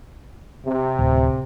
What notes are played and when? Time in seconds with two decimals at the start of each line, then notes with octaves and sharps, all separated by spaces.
0.65 C3
0.99 D1